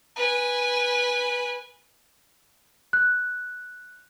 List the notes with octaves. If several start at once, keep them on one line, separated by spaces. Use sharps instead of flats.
B4 G#5
F#6